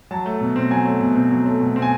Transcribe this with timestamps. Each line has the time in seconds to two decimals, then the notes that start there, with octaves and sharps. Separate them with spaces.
0.11 F#3 A5
0.26 A3
0.41 B2
0.56 C4
0.71 F#3 G#5
0.86 A3
1.01 B2
1.15 C4
1.30 F#3
1.46 A3
1.61 B2
1.76 C4
1.82 G#5